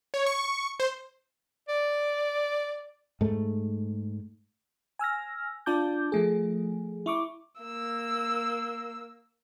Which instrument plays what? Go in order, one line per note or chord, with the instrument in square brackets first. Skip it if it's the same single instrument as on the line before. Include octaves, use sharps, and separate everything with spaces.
[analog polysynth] C#5
C#6
C5
[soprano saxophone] D5
[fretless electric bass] G#2 A3
[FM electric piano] G#5 E6 F6 A#6
D4 F4 A5 D6 G6
F3 A3 G#4
E4 C#6 D6
[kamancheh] A#3 E6